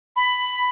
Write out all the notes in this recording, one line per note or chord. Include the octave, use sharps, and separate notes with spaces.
B5